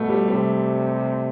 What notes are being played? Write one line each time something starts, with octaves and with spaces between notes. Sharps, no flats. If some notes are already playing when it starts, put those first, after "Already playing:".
Already playing: B2 A3
G3
C3 G3